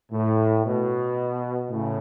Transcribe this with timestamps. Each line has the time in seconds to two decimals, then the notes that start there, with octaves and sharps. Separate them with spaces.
0.12 A2
0.65 B2
1.70 A2 C#3